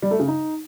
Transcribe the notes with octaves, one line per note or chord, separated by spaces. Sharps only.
G3
A3
C#3
D#4